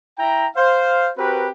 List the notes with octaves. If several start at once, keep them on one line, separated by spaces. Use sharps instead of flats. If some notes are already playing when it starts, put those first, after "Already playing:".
E4 G5 A#5
C5 F5
C4 F#4 G4 A#4 B4